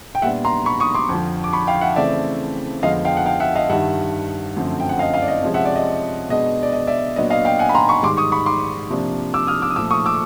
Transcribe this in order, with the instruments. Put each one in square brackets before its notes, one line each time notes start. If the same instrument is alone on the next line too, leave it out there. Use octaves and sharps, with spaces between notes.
[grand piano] G5
A#2 G3 B3 D4 E5 F#5
A#5 C6
B5 C#6
C#6 D#6
C6 D6
F2 D3 F3
D6
B5 C#6
F5 G5
E5 F#5
C#3 E3 A3 C4 D5 E5
F2 D3 F3 G#3 B3 D#5 F5
F5 G5
F#5
F5 G5
E5 F#5
D#5 F5
G2 D#3 G3 E5 F#5
F#2 D3 F3 A3 C4
G5
F#5
D#5 F5
D#5 F5
D5
D#5
C3 F3 G#3 C#4
E5 F#5
D5 E5
D#5
B2 G#3 B3 D4 D#5
D5
D#5
D5 E5
A#2 F#3 B3 D4 D#5
D#5 F5
F5 G5
F#5 G#5
B5
A#5 C6
B5 C#6
G#2 D#3 G3 C6 D6
C#6 D#6
B5 C#6
C6 D6
C3 F3 A#3 D4
D6 E6
D#6 F6
D6 E6
D#6
A#2 F3 A3 D6 E6
C#6 D#6
D6 E6